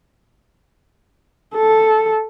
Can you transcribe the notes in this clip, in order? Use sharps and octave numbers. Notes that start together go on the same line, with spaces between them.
A4